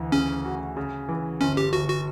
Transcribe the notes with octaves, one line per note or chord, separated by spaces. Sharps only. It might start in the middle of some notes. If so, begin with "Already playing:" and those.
Already playing: D2 E3
C#3 C#4
F#4
C#3
E3
G1 C#4
G4
G1 F#4
F#4